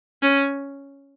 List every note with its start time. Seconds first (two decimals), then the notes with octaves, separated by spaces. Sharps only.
0.22 C#4